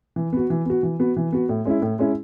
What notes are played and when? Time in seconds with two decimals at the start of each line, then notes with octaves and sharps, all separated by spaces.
0.16 E3
0.33 B3 F#4
0.50 E3
0.66 B3 F#4
0.83 E3
1.00 B3 F#4
1.17 E3
1.32 B3 F#4
1.49 A2
1.65 G#3 C#4 E4
1.82 A2
1.99 G#3 C#4 E4